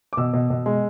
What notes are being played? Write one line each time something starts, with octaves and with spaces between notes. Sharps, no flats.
D6
B2 E6
B2
B2
G#3